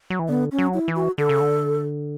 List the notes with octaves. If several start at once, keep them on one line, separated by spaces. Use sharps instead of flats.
F#3
E3
D3 B3
C#4
F#3
E4
E3
F#4
D3 A4
C#3
D3